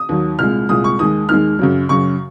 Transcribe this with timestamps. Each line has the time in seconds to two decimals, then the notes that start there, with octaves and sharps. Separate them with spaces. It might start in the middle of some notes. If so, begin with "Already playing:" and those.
Already playing: D#6
0.09 D#2 D#3 F#3
0.39 C2 A#2 G#3 F6
0.69 C2 A#2 G#3 D#6
0.84 C#6
0.99 D#2 D#3 G#3 D#6
1.29 D#2 D#3 G#3 F6
1.59 F#2 C#3 F#3
1.89 F#2 C#3 F#3 C#6